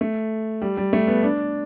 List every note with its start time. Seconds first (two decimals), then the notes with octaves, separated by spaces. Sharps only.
0.01 A3
0.62 G3
0.77 G3
0.93 A3
1.07 B3
1.23 D4